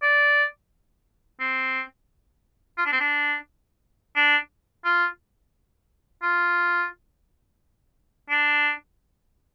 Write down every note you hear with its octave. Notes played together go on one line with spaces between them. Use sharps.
D5
C4
F4
D4
C4
D4
D4
F4
F4
D4